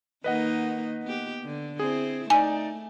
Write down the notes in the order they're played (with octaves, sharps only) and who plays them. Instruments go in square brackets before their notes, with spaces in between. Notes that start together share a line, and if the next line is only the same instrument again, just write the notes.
[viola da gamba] D#3 A#3 D#4 [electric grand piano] B4 D#5 F#5
[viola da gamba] B3 G4
D3
[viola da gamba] C4 E4 [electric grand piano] G#4
[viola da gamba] A3 [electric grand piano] D#4 D5 [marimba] G#5